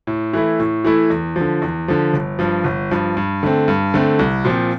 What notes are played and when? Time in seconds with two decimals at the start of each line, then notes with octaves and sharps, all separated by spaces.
0.07 A2
0.33 E3 A3 E4
0.60 A2
0.85 E3 A3 E4
1.10 E2
1.36 F3
1.41 D3
1.62 E2
1.88 D3 F3
2.13 G1
2.39 G2 F3
2.64 G1
2.91 G2 F3
3.17 G2
3.43 D3 A3 C4
3.68 G2
3.94 D3 A3 C4
4.19 C2
4.45 A#2 F3 C4